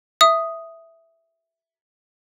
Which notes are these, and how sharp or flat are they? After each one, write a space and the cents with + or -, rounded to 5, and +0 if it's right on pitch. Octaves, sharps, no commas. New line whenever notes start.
E5 +0 D#6 +0